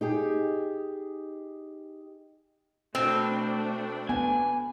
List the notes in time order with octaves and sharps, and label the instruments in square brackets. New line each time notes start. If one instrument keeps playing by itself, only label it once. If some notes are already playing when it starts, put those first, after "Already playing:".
[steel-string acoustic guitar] D#4 G4 G#4
[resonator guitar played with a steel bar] B2 C4 [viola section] A3 D4
[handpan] B3 [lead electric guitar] G#5